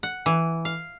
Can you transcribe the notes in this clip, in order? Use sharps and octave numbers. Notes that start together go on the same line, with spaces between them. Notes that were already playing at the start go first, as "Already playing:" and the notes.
F#5
E3
F5